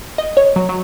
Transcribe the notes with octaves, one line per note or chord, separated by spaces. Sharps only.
D#5
C#5
F#3
F#3